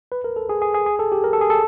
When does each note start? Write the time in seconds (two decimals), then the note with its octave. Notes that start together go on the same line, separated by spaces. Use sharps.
0.12 B4
0.24 A#4
0.36 A4
0.49 G#4
0.62 G#4
0.74 G#4
0.86 G#4
0.99 A4
1.12 G4
1.24 A#4
1.33 A4
1.41 G#4
1.50 A4